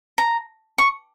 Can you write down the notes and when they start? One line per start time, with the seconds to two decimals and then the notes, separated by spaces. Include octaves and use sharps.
0.18 A#5
0.78 C#6